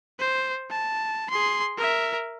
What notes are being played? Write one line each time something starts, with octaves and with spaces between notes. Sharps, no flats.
C5
A5
G#4 C6
A#4 E5